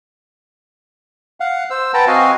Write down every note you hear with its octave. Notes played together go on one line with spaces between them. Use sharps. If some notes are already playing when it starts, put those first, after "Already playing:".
F5 F#5
C5 E6
B4 F#5 G5 A5 A#5
C4 F#4 D#5 F5 G#5